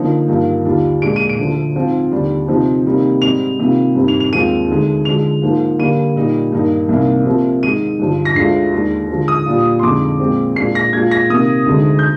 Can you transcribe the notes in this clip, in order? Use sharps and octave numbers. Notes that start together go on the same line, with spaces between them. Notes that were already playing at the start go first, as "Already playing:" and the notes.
Already playing: D3 F3 A#3 D#4
G2 D#3 A#3 F4
D#2 D3 G3 D4 F4
A#2 G#3 D4 D7
D#7
D7
D2 D3 F3
G#2 F3 C4 F4
D#2 D3 G3 D4
C3 F3 C4 D#4
C3 D#3 G3 A#3 D#4
G#2 G3 C4 D#4 F7
C3 D#3 G3 A#3 F4
G2 D#3 G3 C4 D#4
F7
F7
D#2 D#3 G#3 C4 F4 D#7
D2 D3 G#3 D#4
D3 F3 G#3 F7
G#2 F3 A#3
D3 G3 A#3 D#7
A#2 G3 A#3 D#4
G2 D#3 A#3 D#4
C2 C3 D#3 A#3
C3 F3 A#3
G#2 D#3 G#3 D#4 D#7
G2 D3 F3
A#6
D2 D3 G#3 D4 F4 C7
D#2 D#3 G#3 D4
D3 F3 G#3
D#6
A#2 G3 D4 F4
C6
F2 D3 G#3 D#4 D6
A#2 G#3 C4
A#2 G#3 D4 F4 C7
A#6
A#2 G#3 D4 F4 G#6
A#6
C3 D#3 A#3 D#6
D2 D3 G#3 D#4
G6